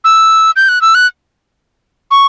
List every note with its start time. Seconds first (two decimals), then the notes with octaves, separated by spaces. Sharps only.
0.04 E6
0.56 G6
0.68 F#6
0.81 E6
0.95 F#6
2.11 C#6